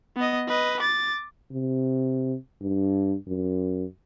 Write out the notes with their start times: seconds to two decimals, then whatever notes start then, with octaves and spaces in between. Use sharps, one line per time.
0.17 B3 D#5
0.48 B4 D#5
0.80 D6 A6
1.52 C3
2.61 G2
3.28 F#2